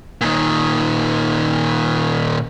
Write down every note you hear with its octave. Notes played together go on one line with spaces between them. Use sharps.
A#2 D#3